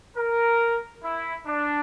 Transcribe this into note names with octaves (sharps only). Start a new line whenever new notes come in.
A#4
E4
D4